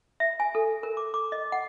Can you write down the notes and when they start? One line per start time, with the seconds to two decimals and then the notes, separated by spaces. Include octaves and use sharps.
0.20 E5
0.40 G#5
0.55 A4
0.83 A#4
0.97 D6
1.14 D6
1.32 D#5
1.52 F#5